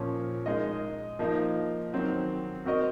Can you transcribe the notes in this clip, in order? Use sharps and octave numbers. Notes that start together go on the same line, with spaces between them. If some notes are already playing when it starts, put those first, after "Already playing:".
Already playing: A#2 F3 A#3 C#4
G#3 D#4 A#4 D#5
F3 A#3 D#4
D#3 F#3 C4
C4 F#4 A#4 D#5